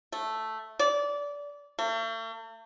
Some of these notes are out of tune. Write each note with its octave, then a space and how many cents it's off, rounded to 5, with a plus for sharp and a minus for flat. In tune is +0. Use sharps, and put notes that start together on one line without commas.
A3 +0
D5 -25
A3 +45